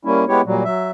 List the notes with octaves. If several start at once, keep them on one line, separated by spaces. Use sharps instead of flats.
G3 A#3 C#4 E4
G#3 B3 E4 G4 C#5
A#2 F#3 G3
F#3 E5